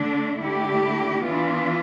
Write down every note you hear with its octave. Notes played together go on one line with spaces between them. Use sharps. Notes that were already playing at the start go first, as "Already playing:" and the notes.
Already playing: D3 A3 D4
D3 A3 E4 G4
E3 B3 D4 F4